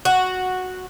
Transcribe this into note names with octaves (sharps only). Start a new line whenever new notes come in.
F#4